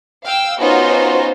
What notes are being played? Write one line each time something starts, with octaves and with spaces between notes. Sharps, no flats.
F5 G5 E6
B3 C#4 D#4 F4 F#4 C5